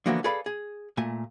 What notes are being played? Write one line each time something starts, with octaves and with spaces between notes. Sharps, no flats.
D3 E3 F3 A#3 B3 F#4
G#4 A4 B4 D5 F5 B5
G#4
A#2 A3 G#5